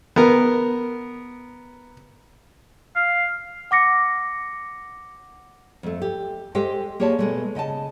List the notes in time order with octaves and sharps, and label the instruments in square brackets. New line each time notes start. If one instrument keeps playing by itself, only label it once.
[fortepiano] B3 A#4
[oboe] F5
[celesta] F#5 D6 A#6 C#7
[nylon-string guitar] F2 A3
G4
G#3 G4 A4 C5 D#5 G5
A#3 G4 G#4 C#5 D5 A5
B2 G#3 A3
C#3 D#5 G5 A5